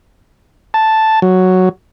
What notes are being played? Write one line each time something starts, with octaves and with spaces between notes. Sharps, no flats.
A5
F#3